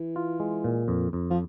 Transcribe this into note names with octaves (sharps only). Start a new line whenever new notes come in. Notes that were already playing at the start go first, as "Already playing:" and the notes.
Already playing: E3
F4
G#3
A#2
F2
F2
F3